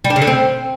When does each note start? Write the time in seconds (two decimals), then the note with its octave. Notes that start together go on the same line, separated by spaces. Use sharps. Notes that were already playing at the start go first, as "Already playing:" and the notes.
0.04 G3
0.10 D4
0.16 C#3
0.22 D3
0.27 C4